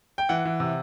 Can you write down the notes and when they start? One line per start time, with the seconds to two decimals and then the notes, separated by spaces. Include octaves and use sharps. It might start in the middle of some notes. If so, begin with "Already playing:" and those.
0.18 G5
0.29 E3 F#5
0.45 E3
0.60 C3